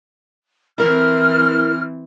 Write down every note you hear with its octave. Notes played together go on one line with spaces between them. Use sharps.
E3 C4 E4 A#4 C5 F6